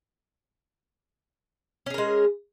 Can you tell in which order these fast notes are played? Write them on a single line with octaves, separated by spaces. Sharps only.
C#4 G#4 A#4 G#3